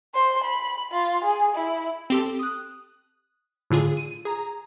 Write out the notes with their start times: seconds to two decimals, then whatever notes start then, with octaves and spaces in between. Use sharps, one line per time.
0.14 C5
0.44 B5
0.92 F4
1.24 G#4
1.56 E4
2.10 C4 G4 A4
2.39 D#6 F#6
3.71 A2 D3 F4 G#4
3.97 D#7
4.25 G#4 A#5